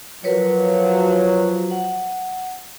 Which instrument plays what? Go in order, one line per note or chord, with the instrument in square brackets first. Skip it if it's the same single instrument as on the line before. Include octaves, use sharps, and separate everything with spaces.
[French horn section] F3 F#3 [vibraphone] A#4 B4 C#5
[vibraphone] F#5